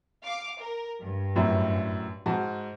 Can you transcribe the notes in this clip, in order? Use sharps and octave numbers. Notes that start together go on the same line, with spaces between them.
F5 D6
A#4
G2
F#2 A2
G#2 F#4 A5